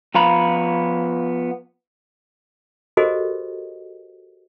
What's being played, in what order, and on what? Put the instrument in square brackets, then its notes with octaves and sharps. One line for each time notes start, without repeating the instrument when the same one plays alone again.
[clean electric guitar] F3 B3 F5 A#5 B5
[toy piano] F#4 G4 A4 A#4 C5 D#5